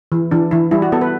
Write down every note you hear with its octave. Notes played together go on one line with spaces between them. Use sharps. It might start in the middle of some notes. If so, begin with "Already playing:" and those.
E3
E3 D4
E3 E4
G3 E4
F#4
B3 A4
B4